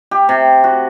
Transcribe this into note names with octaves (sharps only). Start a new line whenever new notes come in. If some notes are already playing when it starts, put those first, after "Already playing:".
G4
C3
F#4